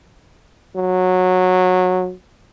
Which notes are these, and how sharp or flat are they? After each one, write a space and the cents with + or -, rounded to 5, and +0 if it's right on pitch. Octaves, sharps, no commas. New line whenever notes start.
F#3 -15